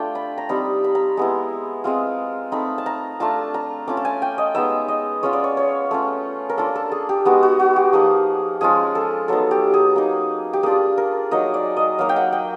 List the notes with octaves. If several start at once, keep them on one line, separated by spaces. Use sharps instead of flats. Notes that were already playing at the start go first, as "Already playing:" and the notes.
Already playing: A3 D4 F4 G5
B5
A#5
G3 C4 D#4 B5
B5
A#5
G#3 B3 E4
G#3 C4 F4
A3 C4 D#4 B5
A5
A#5
A3 D4 F4 A5
A#5
A3 C#4 F4 D6
A5
G#5
G5
D#5
G#3 B3 D#4 E5
D#5
G#3 C#4 F4 C#5
D5
C#5
C#5
A3 C#4 F4
A#4
A#3 D4 F4 A4
A4
G#4
G4
G#3 B3 D#4 F#4
F#4
F#4
G4
F3 A#3 D#4 G#4
F3 G#3 C#4 F4 G#4
A4
F#3 B3 D#4 A4
G4
G#4
A#3 D#4
G4
A#3 D4 F4 G#4
A#4
F#3 A#3 D#4 D#5
D5
D#5
F#3 A#3 D#4 F5
G5
F#5
G5